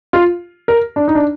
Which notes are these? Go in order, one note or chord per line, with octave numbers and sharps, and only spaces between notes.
F4
A#4
D4
D#4
D4